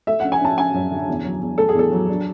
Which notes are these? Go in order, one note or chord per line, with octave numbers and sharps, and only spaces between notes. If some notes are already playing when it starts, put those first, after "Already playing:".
A3 E5
C#4 F#5
G#5
C#4 A5
C#4 G#5
F#2
D3
E2
F#3
E2
A3 A4
G#4
E2 A4
F#3
D4